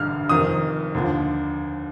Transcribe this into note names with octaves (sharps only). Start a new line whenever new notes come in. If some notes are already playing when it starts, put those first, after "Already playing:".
Already playing: A1 G2 D3 F6
F1 F2 D#3 D#6
D#2 D3 F3